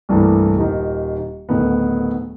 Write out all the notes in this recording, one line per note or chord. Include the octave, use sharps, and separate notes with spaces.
C2 G2 E3 A3 A#3
D#1 D#3
D1 D2 D#3 B3